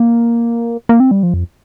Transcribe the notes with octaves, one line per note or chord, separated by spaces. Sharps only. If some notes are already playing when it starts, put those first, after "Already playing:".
Already playing: A#3
A#3
C4
G3
F3
F2